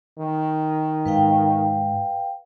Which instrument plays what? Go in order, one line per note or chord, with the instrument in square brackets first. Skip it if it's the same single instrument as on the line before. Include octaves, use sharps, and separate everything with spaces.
[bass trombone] D#3
[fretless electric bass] G#2 [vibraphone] B4 F5 G5